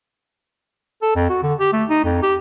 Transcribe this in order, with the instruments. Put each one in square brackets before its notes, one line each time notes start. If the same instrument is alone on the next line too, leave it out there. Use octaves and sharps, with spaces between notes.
[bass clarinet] A4
F2
F#4
D3
G4
A3
D#4
F2
G4